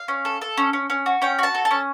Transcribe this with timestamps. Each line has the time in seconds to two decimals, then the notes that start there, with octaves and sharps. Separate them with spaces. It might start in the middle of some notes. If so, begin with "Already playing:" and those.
Already playing: F5
0.08 C#4
0.25 A4
0.41 A4
0.57 C#4
0.73 C#4
0.90 C#4
1.06 F#4
1.22 C#4 G5
1.38 F#4 A5
1.55 A4
1.65 A5
1.71 C#4